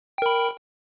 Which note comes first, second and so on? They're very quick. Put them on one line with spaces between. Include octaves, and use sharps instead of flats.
G5 A#4 B5